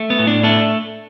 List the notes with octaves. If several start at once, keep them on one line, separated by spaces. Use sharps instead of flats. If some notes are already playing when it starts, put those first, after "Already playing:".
Already playing: A3
B3
A2
D4
A3 D4